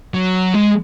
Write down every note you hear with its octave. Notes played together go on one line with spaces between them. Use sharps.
F#3
G#3